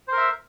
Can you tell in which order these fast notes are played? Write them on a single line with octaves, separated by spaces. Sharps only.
C5 A#4 E5